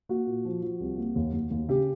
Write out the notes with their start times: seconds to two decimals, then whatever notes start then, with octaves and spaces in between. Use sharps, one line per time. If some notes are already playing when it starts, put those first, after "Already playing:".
0.09 A#3 F#4
0.27 A#2
0.45 F3
0.62 F3
0.80 C2
0.97 A#3
1.16 D#2
1.33 D#2
1.51 D#2
1.69 C#3 G4